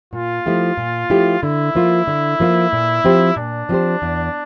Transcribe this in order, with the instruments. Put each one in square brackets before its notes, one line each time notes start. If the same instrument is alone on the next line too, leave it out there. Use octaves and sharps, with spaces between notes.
[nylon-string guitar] A#2 [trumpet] F4
[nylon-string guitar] F3 A3 E4 G4
A#2
F3 A3 E4 G4
[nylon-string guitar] D3 [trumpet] E4
[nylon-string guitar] F3 A#3 F4
D3
F3 A#3 F4
A#2
F3 C4 G4 C5
[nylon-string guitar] A#2 [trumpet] D4
[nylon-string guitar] F3 C4 G4 C5
E2